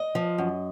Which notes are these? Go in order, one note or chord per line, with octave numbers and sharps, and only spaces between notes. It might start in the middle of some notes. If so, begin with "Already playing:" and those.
Already playing: D#5
F3
F#2